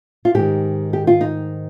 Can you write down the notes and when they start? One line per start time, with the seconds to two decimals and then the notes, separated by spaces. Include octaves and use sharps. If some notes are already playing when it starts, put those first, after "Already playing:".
0.25 F4
0.34 G#2 D#3 G4
0.93 G4
1.07 F4
1.21 D#4